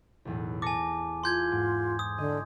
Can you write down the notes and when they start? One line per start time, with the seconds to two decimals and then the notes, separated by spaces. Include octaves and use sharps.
0.25 B1 E2 A2
0.62 G#5 A5 D6 A#6 C#7
1.24 F4 C6 G6 G#6
1.52 G#2
1.99 D#6
2.18 D3 D#5